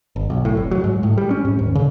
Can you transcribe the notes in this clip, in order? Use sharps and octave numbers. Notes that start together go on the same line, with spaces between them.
G1
B1
A2
F1
F#3
G#2
A2
G3
C#4
G#2
D#1
C#3